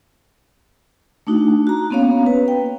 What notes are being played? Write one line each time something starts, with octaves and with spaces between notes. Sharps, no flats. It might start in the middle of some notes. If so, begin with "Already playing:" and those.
A3 D4 D#4 F#4
F#4 A#5
A#3 B3 C#4 C#5 F5
B4
G5